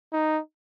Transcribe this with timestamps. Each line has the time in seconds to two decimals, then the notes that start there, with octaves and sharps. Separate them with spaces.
0.13 D#4